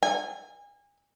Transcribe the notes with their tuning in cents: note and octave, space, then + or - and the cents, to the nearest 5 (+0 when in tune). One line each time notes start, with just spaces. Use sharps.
G#5 -30